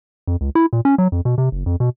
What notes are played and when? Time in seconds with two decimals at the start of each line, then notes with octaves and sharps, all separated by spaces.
0.27 F2
0.41 C#2
0.55 E4
0.73 A#2
0.85 C#4
0.98 F#3
1.12 F2
1.25 B2
1.38 C3
1.52 F#1
1.66 F2
1.80 B2